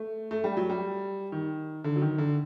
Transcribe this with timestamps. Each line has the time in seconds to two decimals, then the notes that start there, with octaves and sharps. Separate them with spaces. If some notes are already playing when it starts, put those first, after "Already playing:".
Already playing: A3
0.31 A3
0.44 G3
0.57 F#3
0.69 G3
1.32 D#3
1.84 D3
1.96 F#3
2.02 D#3
2.18 D3